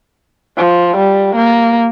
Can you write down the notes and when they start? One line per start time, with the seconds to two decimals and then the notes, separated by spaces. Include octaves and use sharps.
0.58 F3
0.97 G3
1.36 A#3